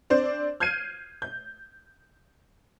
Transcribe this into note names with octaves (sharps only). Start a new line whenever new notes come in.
C4 D4 C5 D5
F6 G6 G#6 C7 D#7
G6